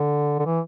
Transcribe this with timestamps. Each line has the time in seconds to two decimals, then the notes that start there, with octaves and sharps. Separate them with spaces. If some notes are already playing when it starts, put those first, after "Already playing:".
Already playing: D3
0.39 D3
0.46 E3